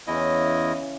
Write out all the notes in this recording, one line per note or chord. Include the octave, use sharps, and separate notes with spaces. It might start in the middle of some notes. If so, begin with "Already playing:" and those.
E2 C#3 E3 E4 D#5